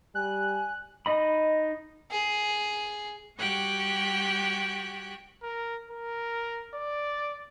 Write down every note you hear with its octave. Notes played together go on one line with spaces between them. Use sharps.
G3 G#5 F#6
D#4 D#5 B5
G#4
G3 F#4 G4 G5 F#6 G#6
A#4
A#4
D5